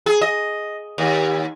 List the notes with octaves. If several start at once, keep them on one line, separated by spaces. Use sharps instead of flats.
G#4
D#5
D#2